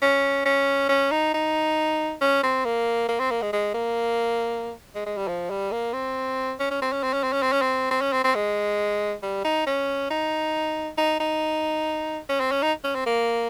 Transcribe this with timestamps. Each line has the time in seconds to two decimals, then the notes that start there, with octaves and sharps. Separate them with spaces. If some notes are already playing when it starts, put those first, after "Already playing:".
0.02 C#4
0.45 C#4
0.89 C#4
1.11 D#4
1.34 D#4
2.21 C#4
2.43 C4
2.65 A#3
3.09 A#3
3.19 C4
3.31 A#3
3.42 G#3
3.53 G#3
3.74 A#3
4.95 G#3
5.06 G#3
5.17 G3
5.28 F3
5.50 G3
5.72 A#3
5.93 C4
6.60 C#4
6.70 C#4
6.82 C4
6.92 C#4
7.03 C4
7.13 C#4
7.23 C4
7.33 C#4
7.42 C4
7.53 C#4
7.62 C4
7.91 C4
8.01 C#4
8.13 C4
8.24 C4
8.35 G#3
9.23 G3
9.44 D#4
9.66 C#4
10.10 D#4
10.97 D#4
11.20 D#4
12.29 C#4
12.40 C4
12.52 C#4
12.62 D#4
12.84 C#4
12.95 C4
13.06 A#3